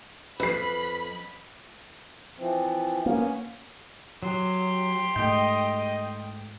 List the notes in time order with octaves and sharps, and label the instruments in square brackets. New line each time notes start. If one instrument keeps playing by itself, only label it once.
[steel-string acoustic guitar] F2 [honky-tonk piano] B4 C7 [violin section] B5
[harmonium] E3 F3 C4
[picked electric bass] A#3 [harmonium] B3 C#4
[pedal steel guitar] F#3 [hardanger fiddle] G4 C6
[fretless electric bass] G#2 A3 [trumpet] D#5 [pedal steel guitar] G5